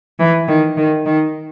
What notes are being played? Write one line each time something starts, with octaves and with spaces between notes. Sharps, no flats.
E3
D#3
D#3
D#3